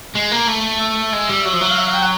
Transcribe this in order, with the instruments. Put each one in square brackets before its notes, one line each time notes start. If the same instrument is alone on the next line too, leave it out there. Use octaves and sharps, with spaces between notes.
[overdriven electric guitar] G#3
A#3
A3
[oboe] E5
[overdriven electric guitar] G#3
G3
F#3
F3
F#3
[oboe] F5
E5
F5
G5
F#5